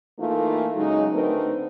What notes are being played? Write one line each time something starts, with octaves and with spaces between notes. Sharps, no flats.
E3 A3 A#3 D#4 F4
C#3 F#3 G#3 C#4 D#4
D3 A3 C4 D#4 A#4 B4